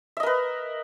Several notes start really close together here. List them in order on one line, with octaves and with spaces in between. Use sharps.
E5 D#5 A#4 B4